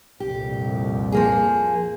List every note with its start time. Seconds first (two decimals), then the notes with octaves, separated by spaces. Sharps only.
0.20 C2 F2 A#2 G4
1.12 F3 A#3 G#4